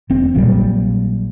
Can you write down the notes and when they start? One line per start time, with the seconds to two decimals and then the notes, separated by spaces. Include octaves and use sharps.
0.10 F1 C4
0.34 A#1 A#2 F#3 G3